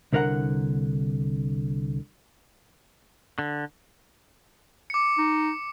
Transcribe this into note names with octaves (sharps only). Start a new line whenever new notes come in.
C2 D3 A#4 C#5 F#5 A#5
D3
D6 C#7
D#4